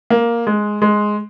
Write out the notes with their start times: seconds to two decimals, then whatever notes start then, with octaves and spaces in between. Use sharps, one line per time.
0.10 A#3
0.47 G#3
0.82 G#3